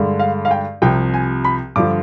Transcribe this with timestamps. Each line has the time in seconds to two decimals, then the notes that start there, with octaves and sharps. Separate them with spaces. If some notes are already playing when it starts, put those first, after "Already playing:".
Already playing: G2 D3 G#3
0.20 F5
0.45 F5
0.51 G5
0.82 C2 C3 F3 G5
1.14 G#5
1.45 B5
1.76 G2 D3 F3 D6